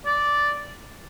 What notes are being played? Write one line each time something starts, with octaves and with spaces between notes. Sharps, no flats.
D5